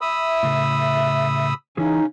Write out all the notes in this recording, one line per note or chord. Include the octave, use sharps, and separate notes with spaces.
E5 B5 D#6 E6
A2 C#3
C#3 E3 C#4 D#4 E4 G#4